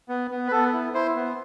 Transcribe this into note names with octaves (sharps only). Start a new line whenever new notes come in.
B3
B3
B4
B3 A4
E4
E4 C5
B3